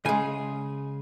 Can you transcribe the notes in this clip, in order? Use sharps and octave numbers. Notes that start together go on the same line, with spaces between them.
C#3 G#3 G#5